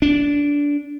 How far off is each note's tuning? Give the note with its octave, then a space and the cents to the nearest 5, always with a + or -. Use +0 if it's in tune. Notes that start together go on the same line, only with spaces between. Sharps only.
D4 -20